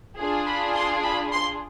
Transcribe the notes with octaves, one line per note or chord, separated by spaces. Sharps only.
D4 F4 G#4
B5
C6
B5
C6